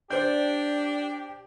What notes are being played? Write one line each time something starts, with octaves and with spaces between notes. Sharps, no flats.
D4 G4 C5 D5 G6